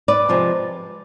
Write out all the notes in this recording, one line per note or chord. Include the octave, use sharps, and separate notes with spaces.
B4 D5
C3 F3 G#3